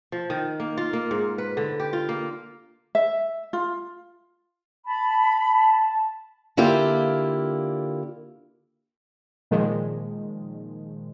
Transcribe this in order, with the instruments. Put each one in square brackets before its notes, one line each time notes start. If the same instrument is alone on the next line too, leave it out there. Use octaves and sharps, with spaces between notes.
[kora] F3
D#3
A#3
F4
A#3
G#2
B4
D3
G4
F4
A#3
[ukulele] E5
F4
[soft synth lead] A5 [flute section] B5
[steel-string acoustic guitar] D3 A#3 E4 F4 G4
[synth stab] A#2 D#3 F3 G#3